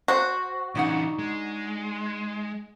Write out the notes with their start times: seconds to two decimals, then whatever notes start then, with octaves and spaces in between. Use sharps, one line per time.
0.08 F#4 C5
0.75 C#3 E3 D4 D#4 F#5
1.19 G#3